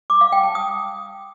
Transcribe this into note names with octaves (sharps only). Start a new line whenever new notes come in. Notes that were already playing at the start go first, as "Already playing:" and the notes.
D6
F5
G5
A5
D#6